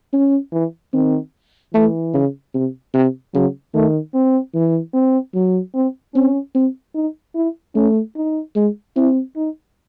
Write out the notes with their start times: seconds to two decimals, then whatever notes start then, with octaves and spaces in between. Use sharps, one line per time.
0.13 C#4
0.53 E3
0.93 D#3 C4
1.74 E3 A3
2.14 C#3
2.54 C3
2.94 C3
3.34 C#3 F#3
3.74 D#3 A3
4.14 C4
4.54 E3
4.94 C4
5.34 F#3
5.74 C4
6.14 C4 C#4
6.55 C4
6.95 D#4
7.35 E4
7.75 A3 C#4
8.16 D#4
8.56 G#3
8.96 C4 E4
9.36 D#4